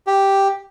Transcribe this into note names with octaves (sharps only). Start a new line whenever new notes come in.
G4